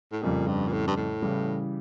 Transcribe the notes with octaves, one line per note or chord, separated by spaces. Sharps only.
A2
F2 A#2 C#3 G3
G2
A#2
A2
G2
A2
C#3 E3 G3